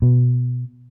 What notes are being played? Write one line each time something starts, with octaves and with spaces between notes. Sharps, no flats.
B2